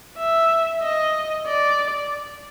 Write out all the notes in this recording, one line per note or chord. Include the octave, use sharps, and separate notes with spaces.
E5
D#5
D5